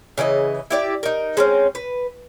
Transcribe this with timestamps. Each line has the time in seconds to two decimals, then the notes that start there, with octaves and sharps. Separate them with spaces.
0.18 C#3 E3 G#4 D#5
0.71 E4 G4 D5
1.03 D#4 A#4
1.37 G#3 C4 C#4
1.75 B4